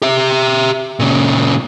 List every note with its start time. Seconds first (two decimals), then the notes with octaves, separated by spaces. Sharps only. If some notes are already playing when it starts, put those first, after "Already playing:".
0.02 G4 E5
0.99 A#2 C#3